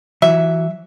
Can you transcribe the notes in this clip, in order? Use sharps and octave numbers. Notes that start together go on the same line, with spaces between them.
E3 F#3 E5